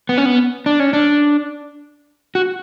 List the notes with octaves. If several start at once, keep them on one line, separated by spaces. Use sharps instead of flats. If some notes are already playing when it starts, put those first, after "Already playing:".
B3
C#4
B3
D4
C#4
D4
F#4